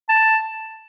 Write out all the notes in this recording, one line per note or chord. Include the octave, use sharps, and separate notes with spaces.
A5